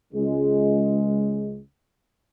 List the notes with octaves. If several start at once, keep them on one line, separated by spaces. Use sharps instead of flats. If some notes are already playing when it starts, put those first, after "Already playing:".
C#2 G#3